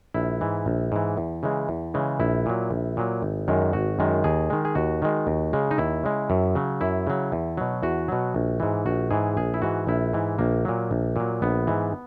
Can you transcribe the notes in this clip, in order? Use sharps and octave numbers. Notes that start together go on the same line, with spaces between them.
A#1 E4
G#2 E3
A#1
G#2 E3
E2
C#3 E3 G#3
E2
C#3 E3 G#3
A#1 E4
A#2 F#3
A#1
A#2 F#3
G#1
F#2 D#3 G#3
G#1 F#4
F#2 D#3 G#3
D#2 G#4
D#3 G#3
G#4
D#2 F#4
D#3 G#3
D#2
C#3 G#3
D#4
D#2 E4
C#3 G#3
F#2
C#3 F#3
F#2 E4
C#3 F#3
E2
B2 F#3
E2 F#4
B2 F#3
A#1
G#2 E3
A#1 F#4
G#2 E3 G#4
A#1 G#4
E4
G#2 E3 F#4
A#1 E4
G#2 E3
A#1 A#3
A#2 F#3
A#1
A#2 F#3
A#1 B3
G#2 E3